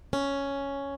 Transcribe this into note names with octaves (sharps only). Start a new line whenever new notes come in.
C#4